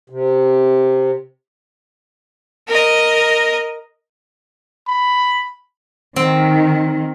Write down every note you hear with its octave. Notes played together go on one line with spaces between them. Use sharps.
C3
A#4 D#5
B5
D#3 C4